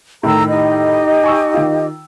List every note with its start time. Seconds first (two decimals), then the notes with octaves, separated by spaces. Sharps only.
0.23 A2 D#3 A4 A#5 E6
0.49 D#4 G4 D#5
1.24 G#5 C#6 E6
1.54 D#3 F4